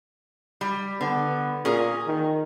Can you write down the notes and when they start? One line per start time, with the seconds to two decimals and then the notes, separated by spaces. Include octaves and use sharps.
0.61 G3
1.01 D3 B3
1.65 A#2 C#4 G#4 A#4
2.08 D#3